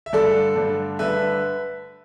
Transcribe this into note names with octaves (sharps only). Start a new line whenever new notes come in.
E5
G2 D3 A3 D4 A4 D5
G2 D3 A3 D4
G2 D3 A3 D4 B4 E5